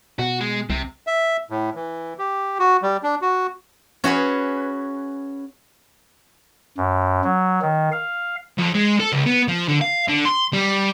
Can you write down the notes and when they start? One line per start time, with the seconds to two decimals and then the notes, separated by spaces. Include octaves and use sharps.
0.19 B2 F#4
0.41 G#3
0.70 C2 C3
1.07 E5
1.50 A2
1.75 E3
2.18 G4
2.59 F#4
2.82 G3
3.03 D4
3.22 F#4
4.04 C#4 F#4 G#4 B4
6.78 F#2
7.24 F#3
7.62 D#3
7.92 F5
8.58 F2
8.75 G#3
9.00 A4
9.13 C#2
9.26 B3
9.48 F3
9.69 D3
9.81 F5
10.08 D3
10.25 C6
10.53 G3